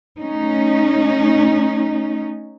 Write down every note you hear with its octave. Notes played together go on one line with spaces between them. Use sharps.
A3 C#4 D#4